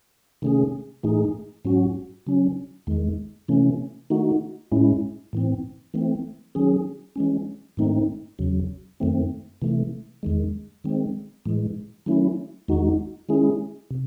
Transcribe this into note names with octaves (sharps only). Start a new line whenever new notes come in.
C3 D#3 A3 C#4 G#4
A2 E3 A3 D#4 G#4
G#2 F#3 C#4 F#4
C#3 F#3 C#4
E2 D#3 G#3
C3 E3 A3 C#4
D#3 A3 D#4 F#4
A2 G#3 C#4 E4
A2 E3 C4
E3 A3 C4
D#3 F#3 C#4 G#4
E3 G#3 C#4
G#2 D#3 A3 C4 D#4
E2 C#3 F#3
F#2 D#3 A3 C4
C3 E3 A3
E2 D#3 G#3
D#3 G#3 C4
A2 E3 G#3
D#3 F#3 A3 C#4 E4
E2 D#3 G#3 D#4 F#4
D#3 G#3 C#4 E4 G#4
C3